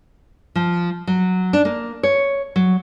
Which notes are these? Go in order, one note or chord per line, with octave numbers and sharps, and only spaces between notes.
F3
F#3
D4
A#3
C#5
F#3